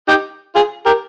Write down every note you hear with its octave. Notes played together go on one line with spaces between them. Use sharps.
D#4 G4
F4 G#4
G4 A#4